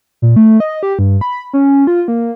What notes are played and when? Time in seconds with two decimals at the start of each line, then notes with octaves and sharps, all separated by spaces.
0.22 A#2
0.36 A3
0.60 D#5
0.83 G4
0.99 G2
1.21 B5
1.54 C#4
1.87 F4
2.08 A#3